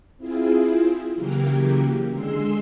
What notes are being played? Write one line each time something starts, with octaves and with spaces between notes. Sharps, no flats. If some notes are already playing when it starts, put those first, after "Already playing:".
C4 E4 F4 G#4
C#3 E3 F#3 A#3 G4 A#4
D3 G#3 G#4 C6 E6